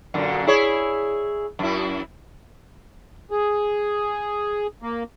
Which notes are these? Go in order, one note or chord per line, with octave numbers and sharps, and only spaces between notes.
F#2 A#2 D3
E4 G#4 C#5
F#2 E4
G#4
A#3